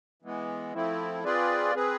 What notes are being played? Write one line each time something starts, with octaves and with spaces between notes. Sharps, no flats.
E3 G#3 B3
F3 A3 C4 E4
C4 F4 G#4 B4 D5
C4 G#4 B4